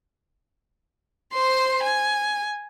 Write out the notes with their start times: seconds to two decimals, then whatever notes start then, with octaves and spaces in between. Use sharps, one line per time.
1.33 C5 C6
1.83 G#5